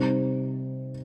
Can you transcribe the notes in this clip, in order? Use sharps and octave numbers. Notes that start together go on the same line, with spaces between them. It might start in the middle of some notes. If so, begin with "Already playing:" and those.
Already playing: C3 G3 C4 D#4